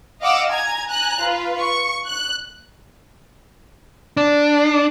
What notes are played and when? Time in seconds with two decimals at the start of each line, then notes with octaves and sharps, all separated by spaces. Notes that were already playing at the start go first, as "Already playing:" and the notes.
0.21 D#5 F5 F#5 D6 E6
0.51 G#5 A#5 G#6
0.89 G#5 A#5 F#6
1.22 F4 B4
1.60 C#6
2.07 F#6
4.17 D4